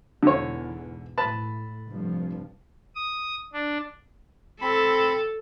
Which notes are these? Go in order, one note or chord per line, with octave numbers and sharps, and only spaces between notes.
E2 G#2 B2 D3 C#5
A2 B4 A5 B5
F1 G2 F3
D#6
D4
C4 A4 B5